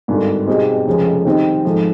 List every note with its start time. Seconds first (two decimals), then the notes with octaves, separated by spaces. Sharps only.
0.08 G#1 G2 D3
0.47 B2 G3 C4 D#4 G#4
0.87 F1 F2 C#3 F3 G#3
1.25 D#3 G3 C4 D#4
1.65 G#2 F3 A3